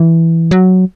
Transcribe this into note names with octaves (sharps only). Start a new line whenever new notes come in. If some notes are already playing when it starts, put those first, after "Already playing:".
Already playing: E3
F#3